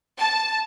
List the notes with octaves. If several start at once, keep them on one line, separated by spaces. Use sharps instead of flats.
A5